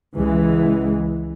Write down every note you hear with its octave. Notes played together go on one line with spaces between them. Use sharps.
C#2 E3 G#3